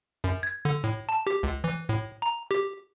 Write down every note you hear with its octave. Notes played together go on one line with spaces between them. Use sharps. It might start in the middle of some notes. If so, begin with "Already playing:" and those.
F#2
G#6
D3
A2
A5
G4
C#2
E3
A2
A#5
G4